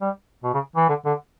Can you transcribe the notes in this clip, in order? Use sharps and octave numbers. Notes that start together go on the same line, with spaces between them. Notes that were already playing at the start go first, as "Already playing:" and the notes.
G3
B2
C#3
E3
D3
D3